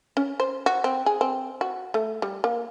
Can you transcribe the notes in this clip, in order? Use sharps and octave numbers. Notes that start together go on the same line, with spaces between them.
C#4
C5
F#4
C4
G#4
C4
F#4
A3
G3
A#3